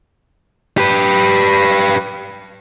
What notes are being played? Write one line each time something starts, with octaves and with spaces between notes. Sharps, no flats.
G4 B4